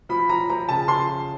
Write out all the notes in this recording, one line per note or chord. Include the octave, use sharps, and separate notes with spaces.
F3 B5
F3 A#5
F3 A#5
C#3 A5
F3 C6